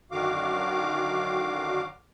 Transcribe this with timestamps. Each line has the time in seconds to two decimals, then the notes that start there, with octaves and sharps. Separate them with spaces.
0.11 F#2 D3 D#3 F#4 F5 D6